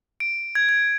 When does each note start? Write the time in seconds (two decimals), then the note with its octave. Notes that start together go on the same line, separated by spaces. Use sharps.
0.20 D7
0.55 G#6
0.69 G#6